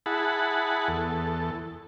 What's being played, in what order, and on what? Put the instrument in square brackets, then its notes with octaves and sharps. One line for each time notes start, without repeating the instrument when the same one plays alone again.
[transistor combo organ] E4 G#4 F#5 A5 B5
E2 A4